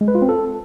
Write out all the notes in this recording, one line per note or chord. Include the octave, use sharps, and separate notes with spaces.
G#3
B4
F4
C4
A4